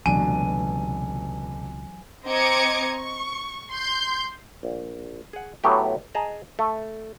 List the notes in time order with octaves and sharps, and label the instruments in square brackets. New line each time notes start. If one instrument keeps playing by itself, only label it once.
[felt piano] F1 D4 D#7 [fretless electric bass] C#2 B2 [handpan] E3 F#3 [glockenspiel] G#5
[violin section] C4 D#5 A#5 D6 G#6 C#7
C#6
C6 G6
[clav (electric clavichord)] A#1
G#4 F#5
A2 F#3 A3 B3 G4
G#4 D#5 A5 A#5
A3